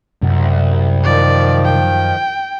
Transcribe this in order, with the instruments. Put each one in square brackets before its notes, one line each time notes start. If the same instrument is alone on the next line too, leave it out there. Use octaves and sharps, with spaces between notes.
[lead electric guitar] C2 [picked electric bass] F#2
[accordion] D#3 F3 [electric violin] D5
[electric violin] G5